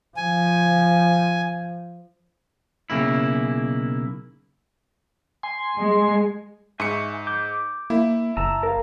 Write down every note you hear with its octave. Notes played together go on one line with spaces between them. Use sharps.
F3 G#5
B1 C#3 A#3 E4
G#5 C6
G#3
G#2 E5 G#5 C#6 C#7
D6 G6
A#3 E4
F#1 A5 A#5 E6
A#4 F5